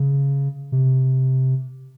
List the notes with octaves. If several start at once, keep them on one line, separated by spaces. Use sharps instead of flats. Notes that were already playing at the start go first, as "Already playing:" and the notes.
Already playing: C#3
C3